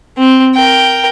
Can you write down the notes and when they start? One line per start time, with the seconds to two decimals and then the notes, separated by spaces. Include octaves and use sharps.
0.18 C4
0.55 A#4 G5